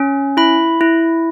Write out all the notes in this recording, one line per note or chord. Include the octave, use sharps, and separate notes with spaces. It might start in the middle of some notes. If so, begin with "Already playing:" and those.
Already playing: C#4
E4 B5
E4